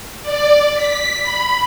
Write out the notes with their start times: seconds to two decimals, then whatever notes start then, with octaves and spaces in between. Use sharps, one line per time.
0.23 D5
0.74 B6
1.23 B5